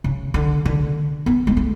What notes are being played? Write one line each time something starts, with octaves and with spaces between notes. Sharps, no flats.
C#3
D3
D3
B3
G#3
A3